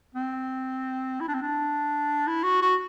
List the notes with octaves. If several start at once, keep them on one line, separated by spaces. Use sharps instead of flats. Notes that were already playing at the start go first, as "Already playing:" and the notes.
C4
E4
D4
C4
D4
E4
F#4
F#4